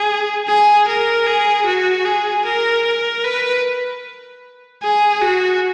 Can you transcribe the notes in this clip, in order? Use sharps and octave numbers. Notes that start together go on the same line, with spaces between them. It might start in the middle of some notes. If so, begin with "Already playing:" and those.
Already playing: G#4
G#4
A#4
G#4
F#4
G#4
A#4
A#4
B4
G#4
F#4